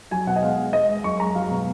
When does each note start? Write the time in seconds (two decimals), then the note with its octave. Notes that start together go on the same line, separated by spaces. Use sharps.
0.11 F#3 G#5
0.27 B2 F#5
0.36 D#5
0.42 G#3 F5
0.58 G#3
0.73 G#3 D#5
0.89 G#3
1.04 F#2 C#6
1.20 G#3 A#5
1.35 F#3 F5
1.51 B2